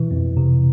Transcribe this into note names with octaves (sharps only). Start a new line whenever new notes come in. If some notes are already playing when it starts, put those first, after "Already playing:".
Already playing: B2 E3
F2
C3